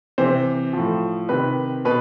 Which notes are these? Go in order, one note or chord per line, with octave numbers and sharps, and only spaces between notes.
C3 E3 C5
A2 F3
C3 D#3 B4
B2 B4